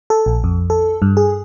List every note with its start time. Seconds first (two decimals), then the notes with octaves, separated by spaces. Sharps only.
0.10 A4
0.26 A#1
0.44 F2
0.70 A4
1.02 G2
1.17 G#4